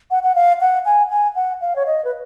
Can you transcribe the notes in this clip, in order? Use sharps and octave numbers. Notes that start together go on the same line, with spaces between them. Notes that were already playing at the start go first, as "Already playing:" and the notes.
F#5
F#5
F5
F#5
G#5
G#5
F#5
F5
C#5
D#5
B4